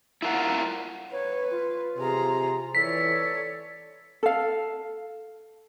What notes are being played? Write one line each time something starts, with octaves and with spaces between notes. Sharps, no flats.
E4 F4 A#4 B4 F#5
B4 C#5
F4
C3 G#4 A#5
E3 A4 C#5 D5 B6
A4 F5